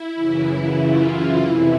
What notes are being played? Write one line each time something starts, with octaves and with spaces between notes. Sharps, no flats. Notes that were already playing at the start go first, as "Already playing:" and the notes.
Already playing: E4
F#2 C#3 E3
F4
F2 C3 E3 E4